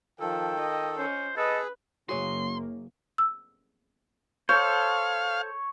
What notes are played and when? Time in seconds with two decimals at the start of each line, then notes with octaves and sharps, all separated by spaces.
0.20 D#3 F3 A4 G5
0.59 D#5
0.98 C#4 C5
1.37 G#4 A4 B4 D#5
2.09 F#1 A#3 F#4 G#4 C#5 C6
3.18 E6
4.49 A4 C5 C#5 F5 G6